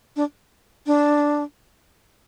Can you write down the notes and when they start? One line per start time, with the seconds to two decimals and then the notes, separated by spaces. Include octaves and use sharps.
0.16 D4
0.87 D4